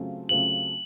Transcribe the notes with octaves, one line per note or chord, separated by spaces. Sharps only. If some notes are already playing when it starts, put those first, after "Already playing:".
Already playing: C#3 F#3 A3 C4 F4
C#3 F#3 A3 C4 F4 F#7